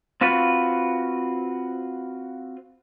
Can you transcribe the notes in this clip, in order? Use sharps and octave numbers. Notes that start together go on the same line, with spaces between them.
C4 F4 F#4 B4